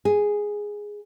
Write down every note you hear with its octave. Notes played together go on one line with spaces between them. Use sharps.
G#4